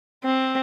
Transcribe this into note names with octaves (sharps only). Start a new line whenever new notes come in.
C4